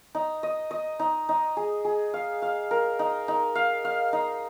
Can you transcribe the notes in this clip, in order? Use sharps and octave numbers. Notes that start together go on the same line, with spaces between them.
D#4
D#5
D#5
D#4
D#4
G#4
G#4
F5
F5
A#4
D#4
D#4
F5
F5
D#4